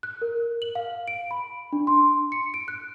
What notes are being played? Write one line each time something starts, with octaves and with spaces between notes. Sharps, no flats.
F#6
A#4
F#7
F5
D7
B5
D4
C6
C#7
D7
F#6